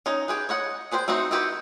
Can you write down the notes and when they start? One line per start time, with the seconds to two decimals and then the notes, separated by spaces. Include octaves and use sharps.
0.06 C#4 D#4
0.28 G4 G#4 B4
0.49 C#5 D#5 F#5
0.91 G#4 B4 C5 D#5 G5
1.08 A3 C4 D#4 F#4 C5
1.31 D#4 E4 F#4 G4 B4